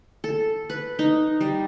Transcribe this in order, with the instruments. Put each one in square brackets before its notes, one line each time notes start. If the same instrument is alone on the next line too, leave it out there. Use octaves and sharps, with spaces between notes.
[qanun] A4
B4
D#4
G3